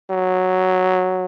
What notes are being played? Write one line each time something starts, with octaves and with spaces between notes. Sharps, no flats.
F#3